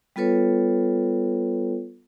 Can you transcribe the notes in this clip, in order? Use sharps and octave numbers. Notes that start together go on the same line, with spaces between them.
G3 B3 F4 A4 B4 C#5